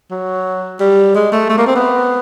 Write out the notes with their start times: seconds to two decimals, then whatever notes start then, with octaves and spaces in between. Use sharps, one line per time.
0.11 F#3
0.80 G3
1.15 G#3
1.32 A3
1.49 A3
1.58 A#3
1.67 C4
1.76 B3